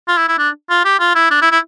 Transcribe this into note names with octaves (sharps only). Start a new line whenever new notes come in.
F4
E4
E4
D4
F4
G4
F4
E4
D4
E4
E4